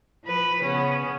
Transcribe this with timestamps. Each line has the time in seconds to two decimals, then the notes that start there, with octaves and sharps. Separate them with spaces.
0.24 F3 B4
0.63 C#3 B3 C#4